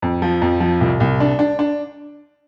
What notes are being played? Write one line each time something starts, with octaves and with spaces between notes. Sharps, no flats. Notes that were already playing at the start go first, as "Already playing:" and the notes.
F2
F3
F2
F3
C2
C2
D4
D4
D4